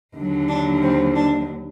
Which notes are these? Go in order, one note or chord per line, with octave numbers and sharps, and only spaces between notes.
D#2 D3 F#3
D4
C4
D4